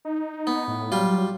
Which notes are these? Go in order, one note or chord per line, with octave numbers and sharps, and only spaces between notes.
D#4
B3
A2
F#3 G3 F4